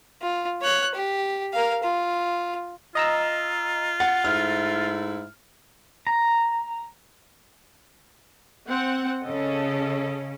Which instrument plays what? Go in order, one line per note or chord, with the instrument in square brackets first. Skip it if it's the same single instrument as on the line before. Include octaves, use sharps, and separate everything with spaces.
[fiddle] F4
C#5 F#6
G4
A#4 F5
F4
[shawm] F4 [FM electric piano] D#5 A#5 E6
[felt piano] F#5 [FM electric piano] A6
[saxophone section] G#2 A3 E4 [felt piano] F6
[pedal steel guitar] A#5
[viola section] C4 F#5
[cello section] C#3 C#4 [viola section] A4 D#5